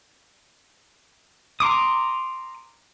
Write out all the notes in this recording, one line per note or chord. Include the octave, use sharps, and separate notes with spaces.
A#5 C6 D6 D#6